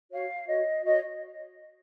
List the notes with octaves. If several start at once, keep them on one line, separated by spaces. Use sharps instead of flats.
F#4 C#5 F5
F#4 C#5 D#5
F#4 C#5 D#5